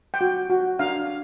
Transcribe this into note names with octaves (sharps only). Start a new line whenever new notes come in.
G5
F#4
F#4
D4 F5